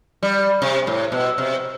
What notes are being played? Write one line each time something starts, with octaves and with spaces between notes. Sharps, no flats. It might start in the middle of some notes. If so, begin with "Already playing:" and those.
G3
C3
A2
B2
C3